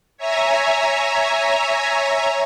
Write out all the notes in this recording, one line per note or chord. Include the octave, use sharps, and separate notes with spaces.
C#5 E5 G#5 A#5